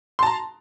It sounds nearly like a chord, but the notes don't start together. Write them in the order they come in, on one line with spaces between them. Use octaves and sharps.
C6 A5 A#5